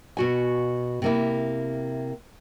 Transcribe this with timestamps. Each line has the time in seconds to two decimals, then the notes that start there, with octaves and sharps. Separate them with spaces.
0.17 B2 F#4 G#5
1.02 C3 A#3 E4